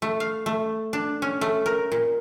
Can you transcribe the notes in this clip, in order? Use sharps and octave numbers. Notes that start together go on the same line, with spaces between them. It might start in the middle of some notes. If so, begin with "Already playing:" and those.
A3
F5
A3
D4
C#4
A3
A#4
A#2